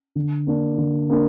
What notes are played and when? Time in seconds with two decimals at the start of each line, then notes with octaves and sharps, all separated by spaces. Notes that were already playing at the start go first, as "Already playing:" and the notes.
0.15 D3
0.47 A#3 D4
0.78 D3
1.10 A#3 D4